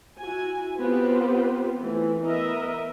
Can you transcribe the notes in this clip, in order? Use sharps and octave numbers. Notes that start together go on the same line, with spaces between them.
E4 F#4 G#5
B3 C4 F4 G4 B4 C5
E3 A3
B3 A#4 D#5 E5